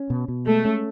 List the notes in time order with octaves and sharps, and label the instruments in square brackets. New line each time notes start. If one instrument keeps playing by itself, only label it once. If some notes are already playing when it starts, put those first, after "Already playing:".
Already playing: [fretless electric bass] C#4
B2
B2
[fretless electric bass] G#3 [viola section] A3
[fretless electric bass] C#4